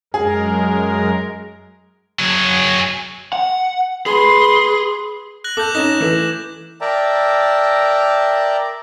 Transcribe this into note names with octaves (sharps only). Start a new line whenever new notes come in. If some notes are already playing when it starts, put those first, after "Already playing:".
F#2 G#3 G#4 A#4
F#3 G#4
F#5
G#4 B4 C6
F#6 A#6 F#7
A4 D6 F#6 G6
C#4 D#4 A#6 E7
E3 A3
A#4 D5 E5 G5 A5 A#5